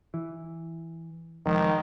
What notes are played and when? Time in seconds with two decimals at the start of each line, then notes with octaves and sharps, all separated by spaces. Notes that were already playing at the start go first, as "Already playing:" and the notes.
0.14 E3
1.45 F1 D#3 F3 G#3